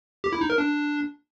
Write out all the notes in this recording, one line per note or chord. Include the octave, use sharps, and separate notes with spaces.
G4
E4
D#4
A#4
D4